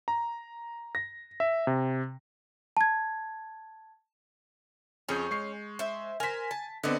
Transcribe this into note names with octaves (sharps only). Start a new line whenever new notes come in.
A#5
A#6
E5
C3
A5 G#6
F2 C#4 G#4 G6
G#3 C#6 C7
C5 E5
A#4 C5 G#5 B6
A5
D3 B3 C4 D5 D#5